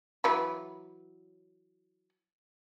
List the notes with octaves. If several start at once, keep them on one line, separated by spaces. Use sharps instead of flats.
E3 F#3 B4